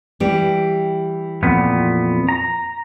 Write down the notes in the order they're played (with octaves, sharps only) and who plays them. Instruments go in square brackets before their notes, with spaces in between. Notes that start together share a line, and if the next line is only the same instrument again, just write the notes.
[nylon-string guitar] E3 G3 G4
[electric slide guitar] F2 A#2 B3
A#5